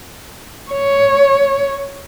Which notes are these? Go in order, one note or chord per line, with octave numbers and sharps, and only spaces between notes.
C#5